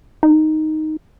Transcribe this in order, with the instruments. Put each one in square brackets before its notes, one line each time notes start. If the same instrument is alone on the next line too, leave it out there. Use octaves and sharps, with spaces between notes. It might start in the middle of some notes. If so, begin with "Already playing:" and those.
[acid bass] D#4